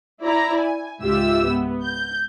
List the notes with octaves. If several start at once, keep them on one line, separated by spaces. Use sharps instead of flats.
E4 D5 A#5
G#5
C#2 G#2 F4 G4 E5 E6
B3
G6